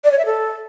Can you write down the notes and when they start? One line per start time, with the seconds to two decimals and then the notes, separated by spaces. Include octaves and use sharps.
0.04 D5
0.11 C#5
0.19 E5
0.26 A4